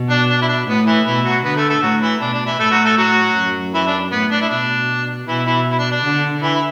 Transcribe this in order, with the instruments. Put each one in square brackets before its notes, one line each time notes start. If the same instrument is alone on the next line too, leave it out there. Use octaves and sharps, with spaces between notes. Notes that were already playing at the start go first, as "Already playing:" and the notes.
Already playing: [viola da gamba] B2
[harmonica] D4
D4
E4
D4
[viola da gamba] A2 [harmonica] B3
[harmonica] E3 E4
[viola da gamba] B2 [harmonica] E3 E4
[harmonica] F#3 F#4
[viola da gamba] D3 [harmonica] B3 B4
[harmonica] A3 A4
A3 A4
[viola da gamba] A2 [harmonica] F#3 F#4
[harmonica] E3 E4
[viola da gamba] B2 [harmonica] D4
[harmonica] D4
E3 E4
[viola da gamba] A2 [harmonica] A3 A4
[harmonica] F#3 F#4
A3 A4
F#3 F#4
[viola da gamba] F#2
[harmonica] E3 E4
D4
[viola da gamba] A2 [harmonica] B3
[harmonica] D4
E4
[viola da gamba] B2 [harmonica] D4
[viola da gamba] B2 [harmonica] E3 E4
[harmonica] E3 E4
E4
D4
D4
[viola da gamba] D3
[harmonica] E3 E4
E4